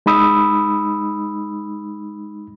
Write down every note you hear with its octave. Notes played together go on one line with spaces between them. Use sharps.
G#3 D#4 B5 D#6 E6